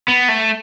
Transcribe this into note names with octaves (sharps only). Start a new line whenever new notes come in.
B3
A3